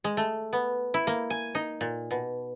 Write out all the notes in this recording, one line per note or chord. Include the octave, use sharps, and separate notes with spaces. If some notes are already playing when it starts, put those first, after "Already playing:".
G#3
A3
B3
E4
A#3
G#5
D#4
A#2
B2